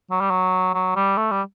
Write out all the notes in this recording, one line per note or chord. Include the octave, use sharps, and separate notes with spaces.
F#3
G3
F#3
F#3
G3
A3
G3